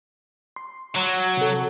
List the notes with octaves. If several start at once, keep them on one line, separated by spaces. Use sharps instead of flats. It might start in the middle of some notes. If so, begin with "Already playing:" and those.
C6
F#3
C3 A4